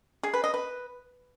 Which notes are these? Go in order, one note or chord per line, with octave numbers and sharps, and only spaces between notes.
G#4
B4
D#5
B4